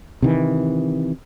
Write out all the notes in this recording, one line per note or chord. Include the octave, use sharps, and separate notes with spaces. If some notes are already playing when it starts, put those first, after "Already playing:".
C3 D#3 E3